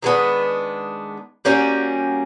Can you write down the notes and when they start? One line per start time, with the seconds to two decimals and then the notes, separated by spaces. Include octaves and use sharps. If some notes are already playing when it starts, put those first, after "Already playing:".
0.02 D#3 G#3 B3 D4
1.45 G3 A#3 C#4 F#4